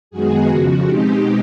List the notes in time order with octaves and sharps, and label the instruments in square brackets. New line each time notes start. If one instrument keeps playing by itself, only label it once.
[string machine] F#2 D#3 G#3 B3 F#4 G#4
F2 C#3 F3 F#4
B2 G#3 C4 D#4 G4